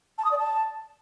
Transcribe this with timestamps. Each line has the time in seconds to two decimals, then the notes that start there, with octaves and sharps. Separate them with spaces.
0.18 A5
0.25 D#6
0.31 D5
0.38 A5